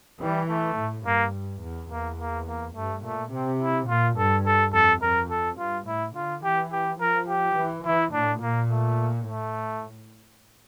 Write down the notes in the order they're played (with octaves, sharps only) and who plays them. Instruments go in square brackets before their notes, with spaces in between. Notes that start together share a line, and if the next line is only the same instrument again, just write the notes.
[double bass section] E3 [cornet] G3
[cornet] A3
[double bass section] A2
[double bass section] G2 [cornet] A#3
[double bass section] E2
[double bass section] E2 [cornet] A#3
[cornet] A#3
A#3
[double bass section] G2 [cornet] A3
[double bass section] A#2 [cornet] A3
[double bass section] C3 [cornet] C4
[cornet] E4
[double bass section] A#2 [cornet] F4
[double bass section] G2 [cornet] A4
[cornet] A4
[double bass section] F2 [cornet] A4
[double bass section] F2 [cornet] A#4
[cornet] A4
[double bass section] G2 [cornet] F4
[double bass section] A2 [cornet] E4
[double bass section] D3 [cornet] F4
[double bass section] E3 [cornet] G4
[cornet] G4
[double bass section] F3 [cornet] A#4
[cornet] G4
[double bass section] E3
[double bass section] E3 [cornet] E4
[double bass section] A2 [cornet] D4
[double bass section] A#2 [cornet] A#3
[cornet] A3
[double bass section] A2 [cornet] A3